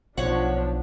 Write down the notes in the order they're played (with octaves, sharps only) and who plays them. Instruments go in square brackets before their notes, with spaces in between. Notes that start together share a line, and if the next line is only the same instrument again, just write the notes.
[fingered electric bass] B1 [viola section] F3 D4 [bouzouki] C#5 F#5